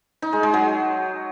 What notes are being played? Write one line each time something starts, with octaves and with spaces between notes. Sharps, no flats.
D#4
G#3
G#3
F#3